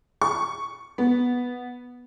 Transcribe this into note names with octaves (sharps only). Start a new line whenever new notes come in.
C#6
B3